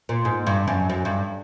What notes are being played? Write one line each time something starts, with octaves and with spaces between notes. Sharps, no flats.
A#2
G#2
G2
F#2
F#2
G2